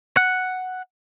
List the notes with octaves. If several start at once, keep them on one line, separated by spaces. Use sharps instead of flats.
F#5